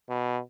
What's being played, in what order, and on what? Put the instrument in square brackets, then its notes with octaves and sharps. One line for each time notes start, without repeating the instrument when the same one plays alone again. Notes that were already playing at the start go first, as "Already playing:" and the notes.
[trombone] B2